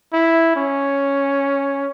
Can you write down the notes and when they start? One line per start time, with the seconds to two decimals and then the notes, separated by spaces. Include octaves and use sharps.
0.13 E4
0.56 C#4